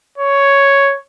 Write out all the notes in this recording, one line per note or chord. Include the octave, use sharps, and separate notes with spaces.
C#5